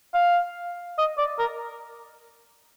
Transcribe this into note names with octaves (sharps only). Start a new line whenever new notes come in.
F5
D#5
D5
A#4